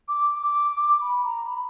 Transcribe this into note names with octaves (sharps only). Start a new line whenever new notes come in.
D6
D6
D6
B5
A#5
B5